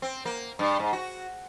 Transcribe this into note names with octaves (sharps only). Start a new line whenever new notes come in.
C4
A#3
G2
G#2
F#4